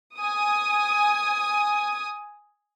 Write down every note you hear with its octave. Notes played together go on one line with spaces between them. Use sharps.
G#5 D#6